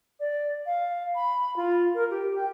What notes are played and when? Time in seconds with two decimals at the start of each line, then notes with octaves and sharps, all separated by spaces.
0.20 D5
0.66 F5
1.15 B5
1.56 F4
1.94 A#4
2.11 G4
2.36 G5